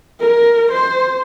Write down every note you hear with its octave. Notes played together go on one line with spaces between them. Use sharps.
A#4
C5